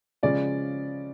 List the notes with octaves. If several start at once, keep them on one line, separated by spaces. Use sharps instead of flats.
C#3 F3 G#3 C#4 D5